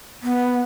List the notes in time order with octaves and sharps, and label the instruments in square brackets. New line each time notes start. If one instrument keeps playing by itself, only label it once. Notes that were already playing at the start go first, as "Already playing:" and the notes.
[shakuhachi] B3